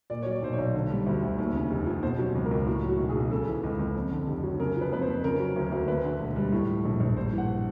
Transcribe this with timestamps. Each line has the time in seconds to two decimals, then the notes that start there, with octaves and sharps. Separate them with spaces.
0.10 A#2 D5
0.22 F#3 C#5
0.31 D5
0.42 B1 C5
0.53 C#5
0.58 B1
0.74 D3
0.90 G3
1.06 D2
1.22 D2
1.38 D#2
1.54 C#3
1.70 F1
1.86 F3
2.03 B2 C5
2.19 F#3
2.35 C#2
2.45 A#4
2.51 C#2
2.67 A2 F#4
2.83 F#3
2.88 F#4
2.99 B1
3.09 G#4
3.15 B1
3.31 C#3 A4
3.47 E3
3.63 C#2
3.79 C#2
3.95 F2
4.11 D3
4.27 F1
4.43 F#3
4.60 C#3 A#4
4.76 F3
4.81 B4
4.92 F2 B4
5.02 C5
5.08 F2
5.24 C#3 A#4
5.40 F#3
5.56 D2
5.72 D2
5.88 D2 B4
6.04 D3
6.20 E1
6.36 G3
6.52 A2
6.68 F3
6.85 A#1
7.00 A#1
7.17 G2 C5
7.32 E3
7.38 F#5